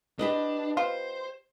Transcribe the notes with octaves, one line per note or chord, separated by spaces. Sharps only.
D4 G4 B4 D#5
B3 F4 C5